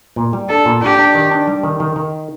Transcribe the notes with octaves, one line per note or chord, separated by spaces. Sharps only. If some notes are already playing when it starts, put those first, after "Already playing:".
A#2
G3
D4 A4
A#2
D4 G4
D4
D#3
D4
G3
D#3
D#3
D#3